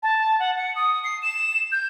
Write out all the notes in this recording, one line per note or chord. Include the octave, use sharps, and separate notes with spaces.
A5
F#5
C#7
D#6
C7
E7
G6